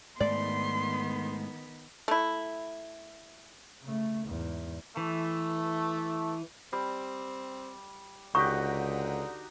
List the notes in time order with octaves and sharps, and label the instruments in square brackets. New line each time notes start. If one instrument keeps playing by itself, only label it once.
[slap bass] G#2 A3 [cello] D#3 B3 [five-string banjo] D5 [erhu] C6
[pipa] A3 E4
[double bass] C#3 A3
E2 G#2
[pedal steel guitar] E3 [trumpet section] A3
[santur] G3 [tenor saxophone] C4
[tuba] C#2 [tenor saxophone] D3 [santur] D#4 F#4 G4 [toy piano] C#6